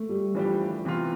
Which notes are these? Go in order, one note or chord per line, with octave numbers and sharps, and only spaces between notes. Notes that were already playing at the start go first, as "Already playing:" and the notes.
Already playing: A3
G3
E3 F3 G3 D4 G4
C3 E3 B3 F4